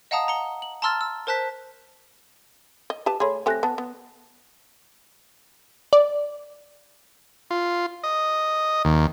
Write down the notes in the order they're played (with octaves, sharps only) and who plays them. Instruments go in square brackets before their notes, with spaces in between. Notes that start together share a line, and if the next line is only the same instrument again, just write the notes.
[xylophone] D#5 F5 F#5 A5 A#5 D#6
A#5 C#7 G7
F#7
A5 A#5 C6 E6 F6 A6
E6
A#4 C5 A5 F#6 B6
[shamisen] D#5
G4 B4 A5
[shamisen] A3 G#4 [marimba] C#5 B5 C6
[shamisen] A3 C4 G4 [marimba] G#5 F#6 A#6
[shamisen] B3 [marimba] A5
[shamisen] B3
[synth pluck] D5
[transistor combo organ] F4
D#5
D#2